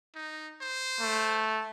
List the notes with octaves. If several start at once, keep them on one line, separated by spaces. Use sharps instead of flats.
D#4
C5
A3